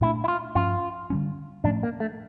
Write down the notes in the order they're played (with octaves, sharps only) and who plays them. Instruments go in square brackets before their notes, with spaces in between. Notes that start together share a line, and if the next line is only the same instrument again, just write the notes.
[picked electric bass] A#2 A3 D4 [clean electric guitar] E4
[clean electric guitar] E4
F4
[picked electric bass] G2 F3 C#4 [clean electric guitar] F4
[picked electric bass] D3 G3 C#4
[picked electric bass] A2 F3 A3 C#4 [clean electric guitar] D4
[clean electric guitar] A#3
A3